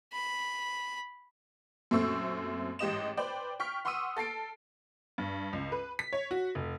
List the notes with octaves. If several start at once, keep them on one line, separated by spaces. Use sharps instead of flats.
B5
F#2 A#2 A3 C4 C#6 E6
A1 G#2 G4 D#5 E7
B4 C5 D5 G5
G5 C#6 F6 B6
F#5 C6 C#6 D#6 E6 D#7
A4 A6 C7 D7
G2
C#2
B4
B6
C#5
F#4
F1